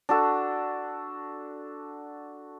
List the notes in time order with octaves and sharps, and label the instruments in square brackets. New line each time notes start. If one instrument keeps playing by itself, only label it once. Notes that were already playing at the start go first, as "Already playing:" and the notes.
[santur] D4 F#4 A4